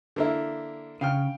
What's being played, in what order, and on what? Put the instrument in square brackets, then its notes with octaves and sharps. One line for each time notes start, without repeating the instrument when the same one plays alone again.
[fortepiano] D3 A#3 E4
[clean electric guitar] C#3 [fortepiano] F5 G5 F6